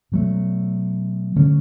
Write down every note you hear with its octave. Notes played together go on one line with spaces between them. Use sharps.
B2 F#3 A3
D3 A3 C#4